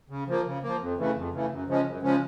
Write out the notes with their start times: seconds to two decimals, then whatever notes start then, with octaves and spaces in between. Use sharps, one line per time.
0.10 C#3
0.28 F3 A#3
0.45 C#3
0.63 F3 A#3
0.80 F2
0.97 C#3 E3 A3
1.15 F2
1.32 C#3 E3 A3
1.50 F#2
1.67 C#3 F3 G#3 C#4
1.85 F#2
2.02 C#3 F3 G#3 C#4